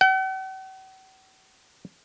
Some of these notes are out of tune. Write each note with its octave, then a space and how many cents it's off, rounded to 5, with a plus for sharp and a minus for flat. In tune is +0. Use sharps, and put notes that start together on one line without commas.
F#5 +45